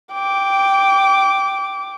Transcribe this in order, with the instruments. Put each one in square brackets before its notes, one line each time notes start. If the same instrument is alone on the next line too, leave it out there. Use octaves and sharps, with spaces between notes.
[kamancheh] G5 D6